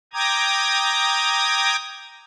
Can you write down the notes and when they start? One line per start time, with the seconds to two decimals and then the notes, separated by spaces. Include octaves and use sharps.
0.13 G5 A#5 D6 D#6 G#6